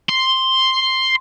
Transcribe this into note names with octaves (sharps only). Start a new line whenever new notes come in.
C6